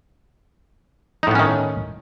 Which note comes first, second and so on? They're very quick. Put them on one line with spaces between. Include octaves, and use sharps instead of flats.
D#4 A2 B3 C#4 D#3